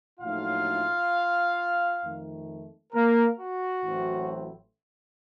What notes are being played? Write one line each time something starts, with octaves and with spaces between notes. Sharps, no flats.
A#1 A2 F#3 A3 D#4 F4 F5
F2 D#3 A3
A#3 A#4
F#4
A1 A2 F#3 C4